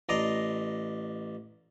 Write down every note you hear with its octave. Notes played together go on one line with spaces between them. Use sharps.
A1 D5 D#5 A#5 C6